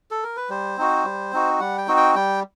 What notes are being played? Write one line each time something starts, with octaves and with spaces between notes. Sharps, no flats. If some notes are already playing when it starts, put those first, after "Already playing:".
A4
A#4
B4
G3 C5
C4 D#4 F#4
G3
C4 D#4 F#4
G3 F#5
G5
C4 D#4 F#4
G5
G3 G5